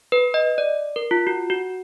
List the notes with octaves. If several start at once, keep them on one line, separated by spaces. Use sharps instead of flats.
B4
D#5
D5
A#4
F4
F#4
F#4